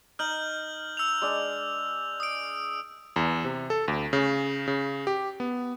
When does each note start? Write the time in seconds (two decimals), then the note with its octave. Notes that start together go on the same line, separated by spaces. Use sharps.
0.19 D#4 F6 G6 F#7
0.97 E6 F7
1.22 G#3 D4
2.20 D#6 D7
3.16 E2
3.44 C3
3.70 A4
3.88 D2
4.13 C#3
4.68 C#3
5.07 G4
5.40 B3